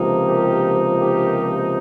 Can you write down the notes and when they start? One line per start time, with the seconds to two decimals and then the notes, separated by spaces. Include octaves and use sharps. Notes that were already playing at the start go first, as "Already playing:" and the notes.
Already playing: C#2 C3 F3 A#3 D#4
0.27 G4 A#4
1.00 G4 A#4